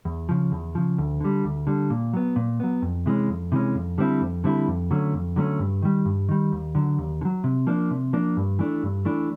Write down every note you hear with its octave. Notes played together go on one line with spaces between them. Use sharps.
E2
C#3 F3
E2
C#3 F3
D2
D3 G3
D2
D3 G3
A#2
F#3 B3
A#2
F#3 B3
F2
C3 E3 G#3 C#4
F2
C3 E3 G#3 C#4
F2
D3 G3 C4 E4
F2
D3 G3 C4 E4
F2
D3 F#3 A3 C#4
F2
D3 F#3 A3 C#4
G2
D#3 G3
G2
D#3 G3
D#2
D3 F#3
D#2
D3
F#3
C3
F3 A#3 D4
C3
F3 A#3 D4
G2
E3 A3 D4
G2
E3 A3 D4